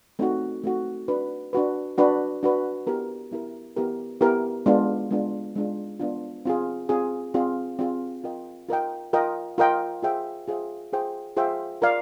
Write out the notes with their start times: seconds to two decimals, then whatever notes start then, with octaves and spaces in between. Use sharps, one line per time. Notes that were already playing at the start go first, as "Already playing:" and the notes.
0.19 A3 C4 D#4 F#4
0.63 A3 C4 D#4 F#4
1.08 D4 F#4 B4
1.53 D4 F#4 B4
1.98 D4 F#4 B4
2.43 D4 F#4 B4
2.87 B3 E4 G4 A#4
3.32 B3 E4 G4 A#4
3.76 B3 E4 G4 A#4
4.21 B3 E4 G4 A#4
4.66 G#3 B3 D4 F4
5.11 G#3 B3 D4 F4
5.55 G#3 B3 D4 F4
6.00 G#3 B3 D4 F4
6.45 C4 F4 G#4
6.89 C4 F4 G#4
7.34 C4 F4 G#4
7.79 C4 F4 G#4
8.24 F4 A#4 D#5 G5
8.69 F4 A#4 D#5 G5
9.13 F4 A#4 D#5 G5
9.58 F4 A#4 D#5 G5
10.03 F4 G#4 C5 E5 G5
10.48 F4 G#4 C5 E5 G5
10.92 F4 G#4 C5 E5 G5
11.37 F4 G#4 C5 E5 G5
11.82 F4 A#4 D5 F5